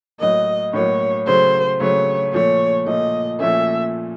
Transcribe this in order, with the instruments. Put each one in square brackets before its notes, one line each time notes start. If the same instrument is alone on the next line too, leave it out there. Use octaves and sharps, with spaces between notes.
[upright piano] A2 F#3 A#3 [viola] D#5
[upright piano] A2 F#3 A#3 [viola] C#5
[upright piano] C#3 F#3 A3 [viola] C5
[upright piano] C#3 F#3 A3 [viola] C#5
[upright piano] A#2 F3 A3 [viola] C#5
[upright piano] A#2 F3 A3 [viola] D#5
[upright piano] A#2 F3 A3 C#4 [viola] E5